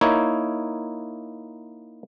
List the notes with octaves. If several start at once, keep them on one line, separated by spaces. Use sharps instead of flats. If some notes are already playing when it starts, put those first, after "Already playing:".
A#3 D#4 E4 C#5